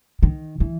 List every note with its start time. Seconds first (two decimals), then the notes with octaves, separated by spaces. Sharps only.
0.23 D#3
0.60 E3